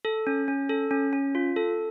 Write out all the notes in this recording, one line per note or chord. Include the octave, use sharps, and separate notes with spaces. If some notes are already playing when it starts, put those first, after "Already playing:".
A4
C#4
C#4
A4
C#4
C#4
F4
A4